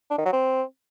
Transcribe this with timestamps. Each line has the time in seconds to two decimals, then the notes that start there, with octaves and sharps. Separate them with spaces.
0.11 D4
0.18 D#3
0.25 F#3
0.33 C4